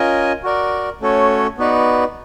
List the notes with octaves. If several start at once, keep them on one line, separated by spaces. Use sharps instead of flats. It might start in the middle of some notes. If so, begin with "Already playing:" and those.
Already playing: C#4 F4 A#4 D#5 G#5
F#4 A#4 D5
A3 C#4 F#4 A4 C#5
B3 D#4 F#4 B4 D5